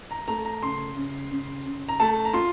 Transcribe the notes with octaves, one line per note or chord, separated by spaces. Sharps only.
A#5
A3 A#5
A#5
C#3 C6
C#3
C#3
C#3
A#5
A3 A5
A#5
F4 C6